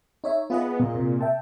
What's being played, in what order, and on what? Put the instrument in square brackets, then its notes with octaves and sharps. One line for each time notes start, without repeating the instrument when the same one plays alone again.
[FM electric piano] D#4 C#5 E5
[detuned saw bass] B3 [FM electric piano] F4 G#4 D#5
[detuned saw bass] A#2
[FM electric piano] C3
E5 G5 A5